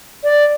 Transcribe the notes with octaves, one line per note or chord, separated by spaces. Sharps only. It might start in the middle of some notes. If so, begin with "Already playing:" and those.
D5